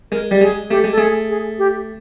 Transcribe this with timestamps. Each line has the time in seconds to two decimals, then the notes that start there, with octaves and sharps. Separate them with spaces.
0.12 G#3 A#4
0.31 G3
0.41 G#3 G#4
0.70 A3 G4
0.84 G#3
0.91 A4
0.97 A3 G#4
1.29 G#4
1.58 G4